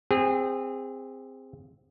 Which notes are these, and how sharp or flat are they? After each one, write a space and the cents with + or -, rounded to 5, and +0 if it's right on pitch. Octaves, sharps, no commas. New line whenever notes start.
C4 -5 G#4 -30